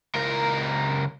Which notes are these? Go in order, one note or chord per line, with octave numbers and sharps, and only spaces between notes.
C#2 A#4